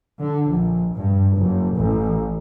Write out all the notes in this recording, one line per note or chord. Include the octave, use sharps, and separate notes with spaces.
D3
A#1
G2
F#1
A1